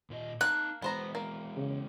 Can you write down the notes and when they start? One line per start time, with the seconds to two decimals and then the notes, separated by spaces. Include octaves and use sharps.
0.10 A#2 F4 D#5
0.41 A#3 D#4 G5 A5 F#6
0.82 E3 G#3 B3 C5 A#5
1.15 A#3
1.57 C#3